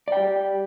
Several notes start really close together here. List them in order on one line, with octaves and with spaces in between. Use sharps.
D5 G5 G4